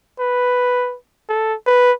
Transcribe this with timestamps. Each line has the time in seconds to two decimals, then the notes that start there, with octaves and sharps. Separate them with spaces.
0.19 B4
1.29 A4
1.66 B4